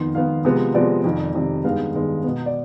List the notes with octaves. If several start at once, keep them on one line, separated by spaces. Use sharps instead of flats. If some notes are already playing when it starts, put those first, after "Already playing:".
Already playing: F2 D#3 B3 C6
F2 D#3 B3 F5
C3 F3 G#3 B3
C3 F3 G#3 B3 D5
F2 C3 D#3
F2 C3 D#3
G2 D#3 G#3 B3 F5
G2 D#3 G#3 B3
B2 B3
D5